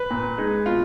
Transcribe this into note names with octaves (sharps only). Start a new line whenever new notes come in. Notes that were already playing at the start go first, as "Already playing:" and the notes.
Already playing: B4
A#2
G#3 D#4
B2 F4